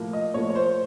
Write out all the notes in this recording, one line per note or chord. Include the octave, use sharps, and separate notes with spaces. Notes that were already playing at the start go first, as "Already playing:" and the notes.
Already playing: A2 F3 A#3
D#5
A2 F3 A#3 C#5
C#5
C5